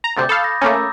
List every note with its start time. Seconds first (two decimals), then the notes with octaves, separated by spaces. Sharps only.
0.04 A#5
0.17 D2 C3 D6 G6 A6
0.29 A4 F5 B5 D#6
0.44 A#6
0.61 A3 A#3 C#4 A#5 D6
0.75 E6